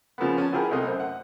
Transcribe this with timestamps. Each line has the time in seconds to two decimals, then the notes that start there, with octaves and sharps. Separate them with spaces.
0.18 C#3 F3 A#3 B3
0.38 C#4 A5
0.52 B3 E4 G4 G#4 A#4
0.71 C2 A3 D#5
0.87 F#2 C5
1.00 F#5